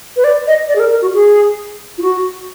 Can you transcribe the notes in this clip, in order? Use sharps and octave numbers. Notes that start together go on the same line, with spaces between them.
B4
D5
D#5
D5
G#4
A#4
A#4
F#4
G#4
F4
F#4